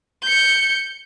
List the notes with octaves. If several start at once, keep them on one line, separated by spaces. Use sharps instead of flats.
G6 C#7